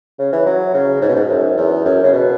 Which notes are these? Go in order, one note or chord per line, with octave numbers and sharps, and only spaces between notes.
C#3
E3
F#3
C#3
G#2
B2
G#2
F#2
E2
F#2
C#3
B2